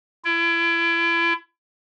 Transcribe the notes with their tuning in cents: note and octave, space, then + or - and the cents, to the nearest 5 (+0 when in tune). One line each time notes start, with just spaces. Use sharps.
E4 +35